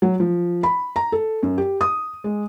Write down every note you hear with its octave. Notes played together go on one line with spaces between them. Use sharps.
F#3
F3
B5
A#5
A4
F#2
G4
D#6
G#3